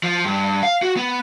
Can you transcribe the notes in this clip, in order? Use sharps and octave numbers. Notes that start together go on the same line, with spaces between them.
F3
G2
F5
F#4
B3